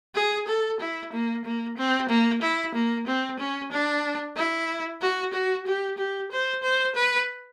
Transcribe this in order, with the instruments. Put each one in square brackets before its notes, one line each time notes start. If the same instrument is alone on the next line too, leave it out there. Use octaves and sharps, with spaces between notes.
[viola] G#4
A4
E4
A#3
A#3
C4
A#3
E4
A#3
C4
C#4
D4
E4
F#4
F#4
G4
G4
C5
C5
B4